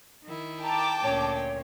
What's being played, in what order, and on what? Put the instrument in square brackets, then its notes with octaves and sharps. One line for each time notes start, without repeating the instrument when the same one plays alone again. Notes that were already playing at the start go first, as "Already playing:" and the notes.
[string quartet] D#3 E4
[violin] G5 [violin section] A5 D6 [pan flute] A#5
[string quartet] D2 A#2 C#4 [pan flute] C#5